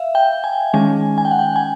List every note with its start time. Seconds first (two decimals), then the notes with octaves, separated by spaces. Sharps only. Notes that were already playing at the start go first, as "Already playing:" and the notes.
Already playing: E5 F5
0.15 G5
0.44 G#5
0.74 D#3 G#3 C#4 G#5
1.18 G#5
1.25 G5
1.31 F#5
1.39 G5
1.56 G#5